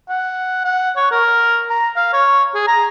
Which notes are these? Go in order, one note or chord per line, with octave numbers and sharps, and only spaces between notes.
F#5
F#5
C#5
A#4
A#5
F5
C#5
G#4
A#5